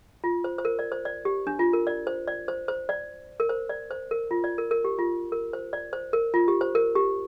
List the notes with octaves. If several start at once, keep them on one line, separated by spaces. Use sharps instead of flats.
F4
C5
C5
A#4
D5
C5
D5
G4
D4
F4
A#4
D5
C5
D5
C5
C5
D5
A#4
C5
D5
C5
A#4
F4
D5
A#4
A#4
G4
F4
A#4
C5
D5
C5
A#4
F4
G4
C5
A#4
G4